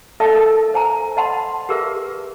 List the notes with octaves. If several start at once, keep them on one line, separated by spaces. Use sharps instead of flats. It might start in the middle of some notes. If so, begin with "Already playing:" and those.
D#4 A4 D#5 E5 A5
A4 A#4
C5 G#5 A#5
D#5 F#5 A5 B5 C6
G4 G#4 A#4 B4 E5